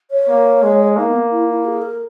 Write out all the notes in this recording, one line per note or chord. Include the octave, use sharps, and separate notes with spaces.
C#5
A#3
G#3
A#3 D#4
B3
E4
E4
G#4
A#4